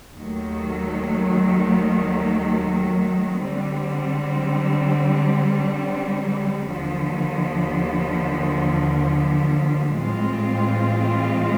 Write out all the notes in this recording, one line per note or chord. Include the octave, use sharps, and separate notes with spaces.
D#2 D#3 F#3 A3
D3 G3 C4
D#2 D3 F3
A2 E3 G#3 C4 F4